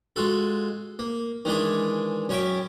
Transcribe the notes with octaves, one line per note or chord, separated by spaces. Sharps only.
G#3 F4 F#4 A4
A#3
D#3 E3 G#3 D4 G#4
F#2 C#4 C#5 E5 G5 D6